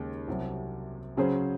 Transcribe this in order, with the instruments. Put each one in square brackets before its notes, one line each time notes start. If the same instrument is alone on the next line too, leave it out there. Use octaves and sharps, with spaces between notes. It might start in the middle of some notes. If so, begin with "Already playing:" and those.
Already playing: [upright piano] D#2 C#3 G#3
C2 C3 F#3
C#3 F#3 C#4 G#4 C5